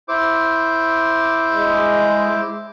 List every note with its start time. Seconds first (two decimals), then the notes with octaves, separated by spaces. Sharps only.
0.08 E4 C5 D6
1.51 G#3